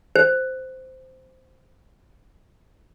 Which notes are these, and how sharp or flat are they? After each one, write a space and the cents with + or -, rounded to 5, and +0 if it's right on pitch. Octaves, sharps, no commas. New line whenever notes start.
C5 -10